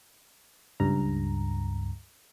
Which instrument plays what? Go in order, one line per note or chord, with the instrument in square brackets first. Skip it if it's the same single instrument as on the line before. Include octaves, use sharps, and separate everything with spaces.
[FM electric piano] C#2 G2 A#5